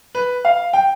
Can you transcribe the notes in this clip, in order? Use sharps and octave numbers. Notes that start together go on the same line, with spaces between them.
B4
F5
G5